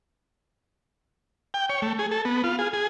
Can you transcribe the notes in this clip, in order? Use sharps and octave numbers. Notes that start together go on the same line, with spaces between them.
G5
C#5
A3
G#4
A4
B3
F4
G#4
G#4